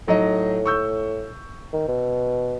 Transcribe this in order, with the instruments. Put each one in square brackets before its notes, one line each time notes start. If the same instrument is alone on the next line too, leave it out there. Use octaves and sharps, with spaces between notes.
[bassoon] A2 [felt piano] F#3 D#4 D#5
[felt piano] C#6 E6 G6
[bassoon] D#3
B2